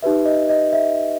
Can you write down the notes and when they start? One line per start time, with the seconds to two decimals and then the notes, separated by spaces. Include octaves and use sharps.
0.03 D#4 G4 B4 E5
0.25 D#5
0.49 D#5
0.73 E5